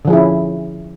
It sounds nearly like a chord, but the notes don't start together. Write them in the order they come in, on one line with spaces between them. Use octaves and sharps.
D3 F3 G#4 E4 C#4